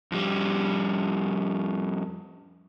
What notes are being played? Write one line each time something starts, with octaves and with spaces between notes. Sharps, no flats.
F2 G3